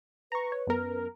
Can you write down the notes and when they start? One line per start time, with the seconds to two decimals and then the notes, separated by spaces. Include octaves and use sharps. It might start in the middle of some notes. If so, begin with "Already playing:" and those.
0.32 B4 A#5 C#6
0.52 C#5
0.67 F#2 B3 A#4